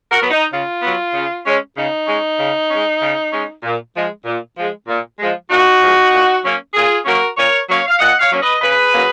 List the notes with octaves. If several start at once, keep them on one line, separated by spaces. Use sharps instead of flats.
F#4 A#4
F#3 B3
D#4
C#3 F4
F#3 B3
C#3
G#3 C#4
C#3 D#4
G#3 C#4
C#3
G#3 C#4
C#3
G#3 C#4
A#2
F3 G#3
A#2
F3 G#3
A#2
F3 G#3
A#2 D#4 F#4
F3 G#3
A#2
F#3 A#3 C#4
A#2 F4 G#4
F#3 A#3 C#4 F#4 A#4
A#2 A#4 C#5
F#3 A#3 C#4 C#5 F5
F5
A#2 D#5 F#5
C#5 F5
F#3 A#3 C#4
B4 D#5
C#3 G#4 B4
F#3 A#3 C#4